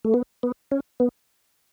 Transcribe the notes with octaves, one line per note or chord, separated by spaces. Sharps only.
A3
B3
B3
C#4
B3